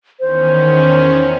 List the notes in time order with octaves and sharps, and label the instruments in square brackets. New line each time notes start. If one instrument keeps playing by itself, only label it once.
[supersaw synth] E2 D#3 C#4 [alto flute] C5